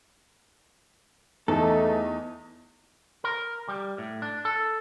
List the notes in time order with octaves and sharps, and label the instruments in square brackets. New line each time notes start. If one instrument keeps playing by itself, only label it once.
[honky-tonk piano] E2 [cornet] A3 [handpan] D#4 [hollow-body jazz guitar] A4
[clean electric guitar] A#4
G3
A2
D4
A4